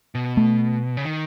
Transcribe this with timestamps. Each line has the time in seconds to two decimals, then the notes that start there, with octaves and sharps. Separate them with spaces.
0.15 B2
0.37 A3
0.97 C#3
1.05 D#3